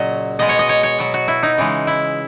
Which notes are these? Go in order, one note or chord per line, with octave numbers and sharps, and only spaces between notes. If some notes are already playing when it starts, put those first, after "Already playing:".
Already playing: A#2 C#3 F#3 D#5
B2 G#3 D#5
C#5
D#5
C#5
C#5
B2 F#3
F#4
E4
D#4
C#3 E3 G#3
E4